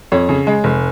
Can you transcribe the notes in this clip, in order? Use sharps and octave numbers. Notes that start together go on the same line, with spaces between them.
F2 C#5
C#3
G#3
F1